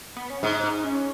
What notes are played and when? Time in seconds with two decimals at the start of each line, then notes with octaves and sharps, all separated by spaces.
0.16 B3
0.30 C#4
0.43 G#2 D#4
0.63 D#4
0.84 C#4